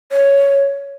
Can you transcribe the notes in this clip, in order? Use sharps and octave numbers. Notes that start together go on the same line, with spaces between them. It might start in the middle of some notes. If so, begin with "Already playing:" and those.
C#5